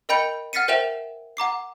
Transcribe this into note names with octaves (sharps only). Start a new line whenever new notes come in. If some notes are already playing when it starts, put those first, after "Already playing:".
A#4 D#5 G5 B5 G6 C#7
F#5 F6 A6 B6 C#7 D#7
A#4 C5 E5 G5 E7 F7
F#5 A#5 D6 C7